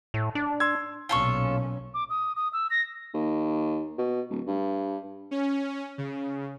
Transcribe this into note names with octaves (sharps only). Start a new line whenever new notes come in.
A2
D4
C6 E6 G#6
B1 A#2 C#4 F4 A4 C#6
D6
D#6
D#6
E6
A#6
D#2
B2
D1
G2
C#4
C#3